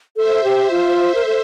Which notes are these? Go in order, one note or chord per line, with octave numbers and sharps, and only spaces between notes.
A4 C5 E5
G4
F4
A#4
A4